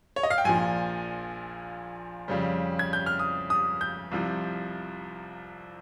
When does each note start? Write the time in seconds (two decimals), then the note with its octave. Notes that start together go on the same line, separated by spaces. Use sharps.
0.16 C#5
0.23 D#5
0.30 F5
0.38 G5
0.45 A#1 A#2 F3 G#5
2.28 F2 C#3 G3
2.79 G#6
2.93 G6
3.06 F6
3.19 D#6
3.50 D#6
3.81 G6
4.12 C2 C3 F3